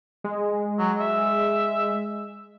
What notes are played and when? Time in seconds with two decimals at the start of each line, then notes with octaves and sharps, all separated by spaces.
0.24 G#3
0.79 F#3
1.00 E5